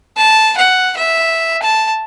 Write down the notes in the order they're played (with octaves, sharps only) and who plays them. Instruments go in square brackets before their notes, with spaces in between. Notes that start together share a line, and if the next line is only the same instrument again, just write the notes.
[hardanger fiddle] A5
F#5
E5
A5